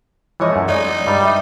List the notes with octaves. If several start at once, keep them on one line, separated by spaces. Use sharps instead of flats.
E3 F3 G#3 E4 C#5 D#5
F#2 A3
G#3 D#4 C#5 D5 F#5
G2 G3 B4 A#5
E5 G5